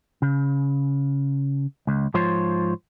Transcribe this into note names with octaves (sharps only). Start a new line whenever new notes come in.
C#3
C#2
G#2 F3 F4 C5 C#5 C6